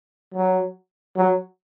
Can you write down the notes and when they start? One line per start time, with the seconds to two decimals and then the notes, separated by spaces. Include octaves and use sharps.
0.34 F#3
1.17 F#3